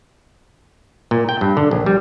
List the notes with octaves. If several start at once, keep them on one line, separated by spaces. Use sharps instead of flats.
A#2
G5
G2
D3
A#1
G3